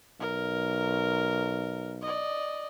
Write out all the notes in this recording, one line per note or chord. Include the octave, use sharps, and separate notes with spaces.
B1 A#4
D5 D#5